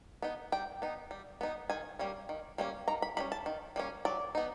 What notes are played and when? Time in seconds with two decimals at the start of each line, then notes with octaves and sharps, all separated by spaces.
0.22 B3 D#4
0.52 G3 G5
0.82 B3 D#4
1.11 G3
1.41 B3 D#4
1.70 D#3 G#5
1.99 G3 A#3 C#4
2.29 D#3
2.58 G3 A#3 C#4
2.88 D#3 A#5
3.02 B5
3.17 G3 A#3 C#4 B5
3.32 A5
3.46 D#3
3.76 G3 A#3 C#4
4.05 F#3 D5
4.35 B3 D#4